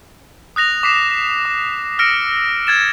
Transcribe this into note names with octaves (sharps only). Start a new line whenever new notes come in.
D#6 F#6 A#6 F7
D6 B6 C7 E7
D6
E6 F6 A#6 C#7 D7
F6 G#6 A6 E7